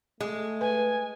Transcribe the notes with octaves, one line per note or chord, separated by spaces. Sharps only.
G#3 A3
B4 G#5